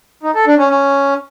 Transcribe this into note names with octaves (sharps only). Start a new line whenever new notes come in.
D#4
A4
D4
C#4
C#4